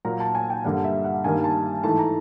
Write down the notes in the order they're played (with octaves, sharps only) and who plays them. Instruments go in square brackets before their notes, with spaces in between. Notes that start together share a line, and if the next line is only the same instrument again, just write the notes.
[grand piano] A#2 F#3 A#3 A#5
A5
G#5
G5
G2 D3 G3 A#3 F#5
E5
F#5
G2 D#3 G3 A#3 G#5
A5
G#2 E3 A3 A5
A#5